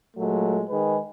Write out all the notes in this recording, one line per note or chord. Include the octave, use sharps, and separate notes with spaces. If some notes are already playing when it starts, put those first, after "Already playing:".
A#2 F#3 G#3 A3
D#3 G#3 G#4 B4